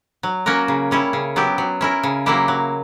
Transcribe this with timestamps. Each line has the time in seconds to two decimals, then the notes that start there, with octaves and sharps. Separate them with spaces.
0.23 F#3
0.46 A#3 C#4 F#4 A#4
0.68 C#3
0.91 G3 C#4 E4
1.13 C#3
1.36 F#3 B3 E4 G4
1.58 F#3
1.81 C#4 E4 A#4
2.03 C#3
2.26 F#3 A#3 E4 G4
2.48 F#3